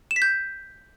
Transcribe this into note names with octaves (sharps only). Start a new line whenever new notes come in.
E7
B6
G6